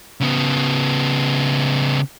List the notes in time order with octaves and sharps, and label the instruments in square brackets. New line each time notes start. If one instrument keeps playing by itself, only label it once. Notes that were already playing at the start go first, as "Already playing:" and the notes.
[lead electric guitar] C#3 B3